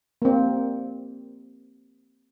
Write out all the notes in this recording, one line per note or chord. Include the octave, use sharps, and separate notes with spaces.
A#3 C4